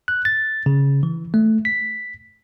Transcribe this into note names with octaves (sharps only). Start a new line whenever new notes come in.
F#6
A6
C#3
E3
A3
B6